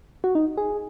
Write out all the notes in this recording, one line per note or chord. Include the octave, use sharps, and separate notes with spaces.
F#4
D#4
G#4